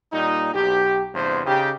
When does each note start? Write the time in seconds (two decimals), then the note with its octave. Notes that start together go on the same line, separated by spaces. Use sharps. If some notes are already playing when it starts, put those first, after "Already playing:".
0.13 A#2 G3 D#4
0.54 B1 G4
1.14 E2 G2 C3 B3 C5
1.46 C#3 D#4 G4